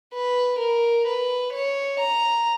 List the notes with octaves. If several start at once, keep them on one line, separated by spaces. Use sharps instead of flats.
B4
A#4
B4
C#5
A#5